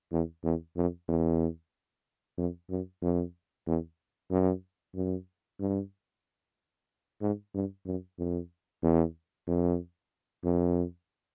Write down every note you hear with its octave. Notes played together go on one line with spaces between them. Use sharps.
E2
E2
F2
E2
F2
F#2
F2
E2
F#2
F#2
G2
G#2
G2
F#2
F2
E2
F2
F2